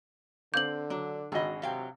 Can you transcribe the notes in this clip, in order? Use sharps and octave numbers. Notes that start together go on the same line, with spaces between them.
D3 C4 F5 D6 G6 F#7
F#3 D4
G#1 F#4 G#4 D#5 B5
C3 F#3 F5 G5